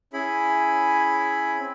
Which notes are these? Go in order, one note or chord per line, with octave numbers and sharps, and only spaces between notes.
C#4 E4 G#4 B5
C4